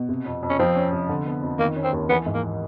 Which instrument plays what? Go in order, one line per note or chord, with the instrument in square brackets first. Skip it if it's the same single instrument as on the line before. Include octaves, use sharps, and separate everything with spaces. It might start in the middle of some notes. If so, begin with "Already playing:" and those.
Already playing: [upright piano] B2
C3
F2
F2
[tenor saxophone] C#4
[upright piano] F3 [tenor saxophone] C4
[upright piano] C#4
C3
D3
B3
F2
[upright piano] D#3 [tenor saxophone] A#3
[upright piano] C#4
[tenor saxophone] C4
[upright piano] D#2
[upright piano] E3 [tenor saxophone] B3
[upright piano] G#2
[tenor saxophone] A#3